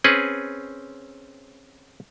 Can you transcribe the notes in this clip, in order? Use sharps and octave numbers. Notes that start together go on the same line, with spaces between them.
C4 C#4 G#4 B4